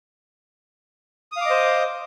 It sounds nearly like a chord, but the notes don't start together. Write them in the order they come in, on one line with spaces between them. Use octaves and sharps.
D#6 F5 D6 D#5 C5